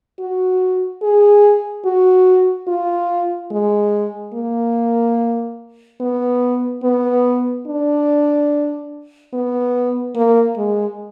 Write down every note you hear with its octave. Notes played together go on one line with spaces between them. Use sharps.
F#4
G#4
F#4
F4
G#3
A#3
B3
B3
D4
B3
A#3
G#3